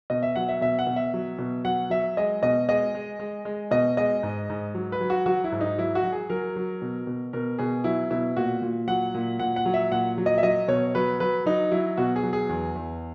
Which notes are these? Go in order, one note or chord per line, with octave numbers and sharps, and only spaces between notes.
B2 D#5
E5
F#3 F#5
E5
B2 E5
F#5
B2
E5
F#3
B2
F#3 F#5
F#3 E5
G#3 D#5
B2 D#5
G#3 D#5
G#3
G#3
G#3
B2 D#5
G#3 D#5
G#2
G#2
F#3
B4
F#3
F#4
F#3 F#4
E4
G#2
D#4
F#3 E4
F#4
F#3
G#4
F#3 A#4
F#3
B2
B2
B2 A#4
B2 G#4
F#3 E4
B2 E4
A#2 F#4
A#2
F#3 F#5
A#2
A#2 F#5
F#5
F#3
E5
A#2 F#5
F#3
D#5
E5
F#3 D#5
B2 C#5
F#3 B4
F#3 B4
F#3 D#4
F#3 E4
B2 F#4
G#4
F#3
G#4
E2
E2